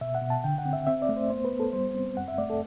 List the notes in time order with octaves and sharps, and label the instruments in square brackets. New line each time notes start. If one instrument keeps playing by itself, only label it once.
[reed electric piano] B2 E5
F#5
B2
A5
D3 G5
F#5
C4
E5
C4 E5
D5
A3
C5
B3 C5
B4
B3
A4
G3 C5
C4
F#2 F#5
E5
A3 D5
A4